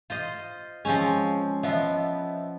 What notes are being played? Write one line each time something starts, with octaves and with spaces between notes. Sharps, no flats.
F4 C5 D#5
F3 G#3 C4 C#4
F3 B3 D#5 E5